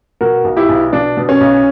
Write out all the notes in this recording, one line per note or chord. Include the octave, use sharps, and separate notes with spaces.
B2 F#4 A#4
B1
E4 G4
B1
B2 D4
B2
C#4
B1